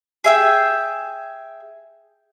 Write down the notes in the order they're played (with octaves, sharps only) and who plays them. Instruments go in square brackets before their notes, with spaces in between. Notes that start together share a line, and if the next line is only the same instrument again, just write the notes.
[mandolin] G#4 E5 G5